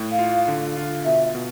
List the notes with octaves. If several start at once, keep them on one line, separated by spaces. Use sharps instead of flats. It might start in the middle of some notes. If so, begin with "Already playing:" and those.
Already playing: A2
F5
F4
D3
F4
B2 E5
B2